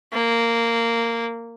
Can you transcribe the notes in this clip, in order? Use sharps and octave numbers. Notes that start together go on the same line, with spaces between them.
A#3